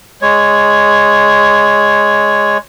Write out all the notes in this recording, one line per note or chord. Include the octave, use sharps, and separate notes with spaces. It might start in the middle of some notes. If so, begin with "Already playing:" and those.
G#3 C#5